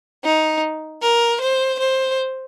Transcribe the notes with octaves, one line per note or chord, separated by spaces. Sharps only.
D#4
A#4
C5
C5